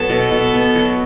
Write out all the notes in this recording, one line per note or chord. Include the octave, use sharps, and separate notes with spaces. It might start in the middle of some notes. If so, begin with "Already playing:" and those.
Already playing: F#3 B3 A4
B2
B2
B3
F#3